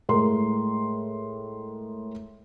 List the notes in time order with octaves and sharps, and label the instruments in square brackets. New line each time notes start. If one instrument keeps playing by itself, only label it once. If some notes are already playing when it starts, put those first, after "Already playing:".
[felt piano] A2 G#3 A#4 C6